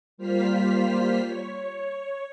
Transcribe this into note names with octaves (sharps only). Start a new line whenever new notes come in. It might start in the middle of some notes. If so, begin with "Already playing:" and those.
G3 A#3 F4 C5 F6 B6
C#5